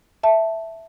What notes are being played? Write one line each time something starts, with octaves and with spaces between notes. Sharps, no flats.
E5 A5